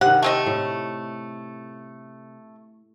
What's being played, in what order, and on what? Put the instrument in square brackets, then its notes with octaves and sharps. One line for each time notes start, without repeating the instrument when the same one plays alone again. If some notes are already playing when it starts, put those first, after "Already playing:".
[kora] C3 D#3 [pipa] F#5
[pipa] A3 C4 D#5
[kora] A2